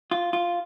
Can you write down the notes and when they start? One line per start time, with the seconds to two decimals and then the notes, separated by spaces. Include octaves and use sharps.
0.11 F4
0.33 F4